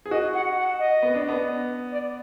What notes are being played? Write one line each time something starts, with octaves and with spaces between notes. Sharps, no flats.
G#4
F#4 D#5
F#5
F#5
D#5
B3
D4
B3
D5